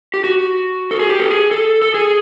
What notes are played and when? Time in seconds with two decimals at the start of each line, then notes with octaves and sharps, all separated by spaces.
0.14 G4
0.24 F#4
0.91 A4
0.99 G#4
1.09 G4
1.20 A4
1.31 G#4
1.51 A4
1.82 A4
1.94 G#4